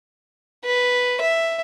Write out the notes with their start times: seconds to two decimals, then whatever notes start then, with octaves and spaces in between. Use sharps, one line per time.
0.64 B4
1.21 E5